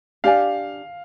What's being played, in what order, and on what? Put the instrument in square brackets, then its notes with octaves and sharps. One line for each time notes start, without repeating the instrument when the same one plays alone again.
[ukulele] D4 G4 D5 G#5 [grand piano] F5